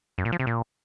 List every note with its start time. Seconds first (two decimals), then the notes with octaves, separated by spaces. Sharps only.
0.18 F#2
0.25 A#2
0.32 F3
0.39 C3
0.47 A#2